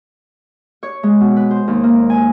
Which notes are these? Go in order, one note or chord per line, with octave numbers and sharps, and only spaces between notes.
C#5
G#3
B2
B4
C5
D#2
A#3
G#5